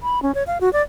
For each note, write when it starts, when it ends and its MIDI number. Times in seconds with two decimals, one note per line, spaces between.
0.03 0.22 83
0.23 0.34 61
0.35 0.43 73
0.47 0.58 77
0.61 0.72 66
0.73 0.82 74